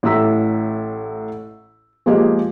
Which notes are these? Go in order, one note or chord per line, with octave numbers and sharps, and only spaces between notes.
A1 A2 E5 A#5 E6 B6
F3 G#3 A#3 G4 G#4 D#5